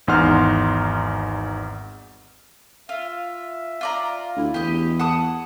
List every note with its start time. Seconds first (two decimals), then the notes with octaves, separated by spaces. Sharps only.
0.07 G#1 E2 D#4 F#5 C6 F6
2.89 F4 E5
3.81 F4 D5 A#5
4.36 D2 E4
4.54 E2 G4 D#5
4.99 F#5 A5 D#6